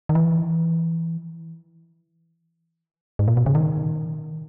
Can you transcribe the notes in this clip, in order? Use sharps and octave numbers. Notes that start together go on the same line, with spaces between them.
D#3
E3
G#2
A#2
B2
C#3
D#3